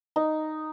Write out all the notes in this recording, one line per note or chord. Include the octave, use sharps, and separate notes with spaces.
D#4